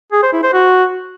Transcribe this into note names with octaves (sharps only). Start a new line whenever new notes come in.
G#4
C5
E4
C5
F#4